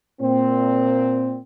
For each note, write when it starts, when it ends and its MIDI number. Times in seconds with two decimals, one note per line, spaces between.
0.20 1.38 46
0.20 1.38 60